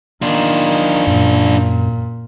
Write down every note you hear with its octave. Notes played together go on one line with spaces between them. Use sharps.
D#3 D4 F4
F#2 A#2